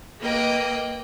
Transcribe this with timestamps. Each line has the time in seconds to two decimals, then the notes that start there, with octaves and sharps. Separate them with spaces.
0.21 A#3 B4 D#5 G5